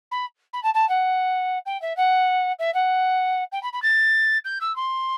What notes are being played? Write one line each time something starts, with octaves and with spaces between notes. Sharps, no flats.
B5
B5
A5
A5
F#5
G5
E5
F#5
E5
F#5
G5
B5
B5
A6
G6
E6
C6